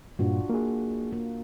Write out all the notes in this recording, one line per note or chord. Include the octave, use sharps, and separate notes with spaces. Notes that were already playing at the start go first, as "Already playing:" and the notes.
G2 A#2 D4 F4 F#4
A#3 G#4
A#3